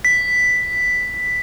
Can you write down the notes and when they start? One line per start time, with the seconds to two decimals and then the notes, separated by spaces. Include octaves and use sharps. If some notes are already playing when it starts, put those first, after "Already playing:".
0.05 B6